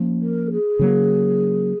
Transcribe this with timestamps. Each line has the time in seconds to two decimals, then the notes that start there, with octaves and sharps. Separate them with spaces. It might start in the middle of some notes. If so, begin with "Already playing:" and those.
Already playing: F3 A#3 C#4
0.22 A#4
0.51 G#4
0.79 C#3 F#3 A#3